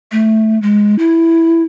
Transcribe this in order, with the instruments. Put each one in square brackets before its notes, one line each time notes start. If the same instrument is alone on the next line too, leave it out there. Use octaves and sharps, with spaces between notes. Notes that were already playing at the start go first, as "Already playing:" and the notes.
[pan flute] A3
G#3
E4